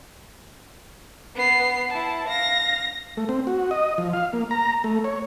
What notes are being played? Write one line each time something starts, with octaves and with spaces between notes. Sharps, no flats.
B3 C7
E4 A5
F5 A#6
A3
C4
F#4
D#5
F3
F5
A#3
A#5
A3
C#5